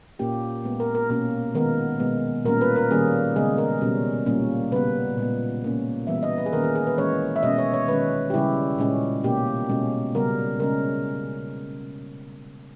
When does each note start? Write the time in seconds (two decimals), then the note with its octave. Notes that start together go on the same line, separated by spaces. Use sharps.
0.19 A#2 A#3 C#4 G4
0.64 A#2 G#3 B3
0.80 A#4
0.95 A#4
1.10 B2 A#3 C#4 A#4
1.55 D#3 G#3 B3 A#4
2.00 B2 G#3 B3
2.45 A#2 G3 A#3 C#4 A#4
2.61 B4
2.76 A#4
2.91 D#3 G3 A#3 C#4 G#4
3.36 C#3 G#3 B3 G#4
3.58 A#4
3.81 B2 G3 C#4
4.26 A#2 G3 A#3 C#4
4.72 C#3 G3 B3 B4
5.18 A#2 G#3 B3
5.62 B2 A#3 C#4
6.07 E3 G3 B3 E5
6.23 D#5
6.38 B4
6.46 G#4
6.53 D#3 A#3 C#4 A#4
6.64 G#4
6.75 G#4
6.87 B4
6.98 E3 G#3 C#4 C#5
7.36 E5
7.43 B2 G#3 C#4 D#5
7.58 C#5
7.73 C#5
7.88 D#3 G#3 C#4 B4
8.30 G4
8.34 C#3 G3 C#4 E4
8.78 A#2 G#3 C#4
9.24 B2 A#3 C#4 G4
9.69 B2 G#3 C#4
10.15 C#3 G3 B3 A#4
10.60 C#3 G#3 C#4 A#4